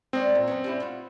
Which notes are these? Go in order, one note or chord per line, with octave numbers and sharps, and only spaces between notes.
G#3 C4 D4 C#5
A#2
F#2 B3 C#4
G3 C#4 E4
F4 F#4